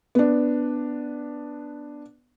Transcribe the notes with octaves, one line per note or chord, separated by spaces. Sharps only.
B3 D4